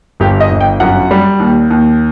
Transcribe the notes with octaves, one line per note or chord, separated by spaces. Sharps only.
G1 G4
D#5
G1
G5
F#2 F#5
G3
D#2
D#2